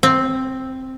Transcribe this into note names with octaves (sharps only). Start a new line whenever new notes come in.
C4